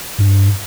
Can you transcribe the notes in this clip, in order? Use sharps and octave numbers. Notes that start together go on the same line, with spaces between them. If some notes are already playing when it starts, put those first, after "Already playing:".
G2